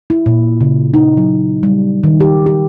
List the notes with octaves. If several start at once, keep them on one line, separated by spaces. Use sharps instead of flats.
E4
A#2
C#3
D#4
F#3
G3
D#3
G4
G4